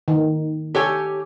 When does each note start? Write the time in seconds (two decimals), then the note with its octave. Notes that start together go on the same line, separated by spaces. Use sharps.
0.08 D#3
0.75 G4 A4 C#5 G#5